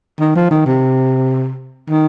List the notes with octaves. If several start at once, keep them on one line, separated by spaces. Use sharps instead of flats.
D#3
F3
D#3
C3
D#3